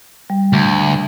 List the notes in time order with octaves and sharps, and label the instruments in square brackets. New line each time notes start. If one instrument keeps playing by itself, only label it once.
[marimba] G3
[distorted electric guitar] D2